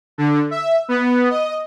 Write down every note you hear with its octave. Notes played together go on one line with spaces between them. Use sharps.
D3
E5
B3
D#5